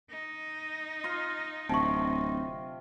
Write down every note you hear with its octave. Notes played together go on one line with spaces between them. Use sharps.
D#4
F4 F5
D1 C3 A5 C#6